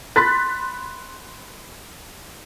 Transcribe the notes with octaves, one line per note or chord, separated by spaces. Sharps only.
B5 C6 F#6 A6 B6